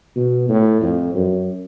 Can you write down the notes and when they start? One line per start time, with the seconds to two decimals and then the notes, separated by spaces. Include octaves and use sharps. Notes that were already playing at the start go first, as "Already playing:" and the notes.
0.16 B2
0.49 A2
0.81 F2
1.15 F#2